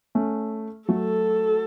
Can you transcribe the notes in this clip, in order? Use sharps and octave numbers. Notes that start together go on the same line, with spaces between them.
A3 C#4
F#3 A3 A4